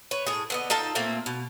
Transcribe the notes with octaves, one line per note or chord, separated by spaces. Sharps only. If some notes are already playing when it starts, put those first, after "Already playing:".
B4 C#5
A2 G#4
D3 B3 D#5
D#4 F4 A4 A5
A#2 A3 A#3 C4
B2